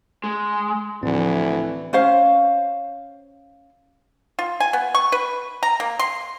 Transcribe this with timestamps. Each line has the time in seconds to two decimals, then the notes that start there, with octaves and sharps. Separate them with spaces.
0.24 G#3
1.03 D2 A2 E3 F3 C4
1.93 C#4 C5 F5
4.39 F4
4.60 G#5
4.73 B3
4.95 C#6
5.12 B4
5.63 A#5
5.80 A#3
5.99 C6